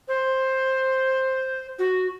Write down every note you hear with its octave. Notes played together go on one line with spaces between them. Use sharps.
C5
F#4